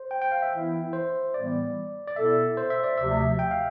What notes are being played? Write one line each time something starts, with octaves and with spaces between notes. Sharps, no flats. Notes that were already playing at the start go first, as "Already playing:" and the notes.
Already playing: C5
G5
G5
F5
E5
E3 B3 E4
C5
A2 E3 G3 B3 D5
D5
B2 B3 E4 A4 E5
C5
E5
D5
D2 C3 F3 E5
G5
F5